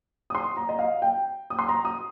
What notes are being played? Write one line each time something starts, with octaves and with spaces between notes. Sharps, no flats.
D#6
C6
A#5
D#5
F5
G5
D#6
C6
A#5
D#6